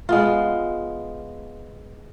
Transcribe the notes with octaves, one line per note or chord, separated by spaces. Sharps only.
G#3 B3 F4